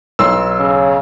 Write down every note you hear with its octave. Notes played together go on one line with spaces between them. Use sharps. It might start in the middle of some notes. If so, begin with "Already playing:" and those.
B1 C6 E6
C#3